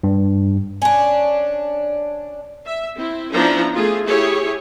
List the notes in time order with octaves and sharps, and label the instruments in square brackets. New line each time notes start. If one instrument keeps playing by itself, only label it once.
[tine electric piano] G2
[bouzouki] C#4 D4
[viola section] E5
C4 E4
F3 B3 C#4 D4 E4 A#5
A3 F4 G#4
E4 G4 G#4 C#5